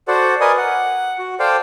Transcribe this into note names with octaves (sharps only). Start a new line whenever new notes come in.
F#4 A4 C5 D5 F#5
A#4 B4 D5 D#5 G#5 D#6
F#5
F#4
A4 C5 D5 F5 G5